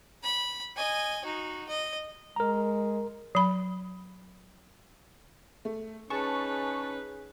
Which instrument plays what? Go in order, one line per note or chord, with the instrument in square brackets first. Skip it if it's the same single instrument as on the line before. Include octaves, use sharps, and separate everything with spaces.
[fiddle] B5
D#5 G#5
D#4 F#4
D#5
[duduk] G#3 [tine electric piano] A#4 A#5
[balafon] F#3 B5
[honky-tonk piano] A3
[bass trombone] C#4 [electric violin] D#4 B4 [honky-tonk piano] G#4 [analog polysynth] A5 C#6